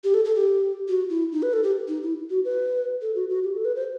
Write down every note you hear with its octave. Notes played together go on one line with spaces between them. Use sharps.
G4
A4
A4
G4
F#4
E4
D#4
B4
A4
G4
D#4
E4
F#4
B4
A4
F#4
F#4
G4
A4
B4
C5